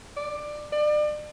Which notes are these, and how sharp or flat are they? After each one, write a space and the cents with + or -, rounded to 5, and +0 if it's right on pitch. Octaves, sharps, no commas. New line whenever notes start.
D5 +15
D5 +35